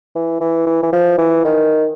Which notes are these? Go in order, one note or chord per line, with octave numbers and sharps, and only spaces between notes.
E3
E3
E3
E3
F3
E3
D#3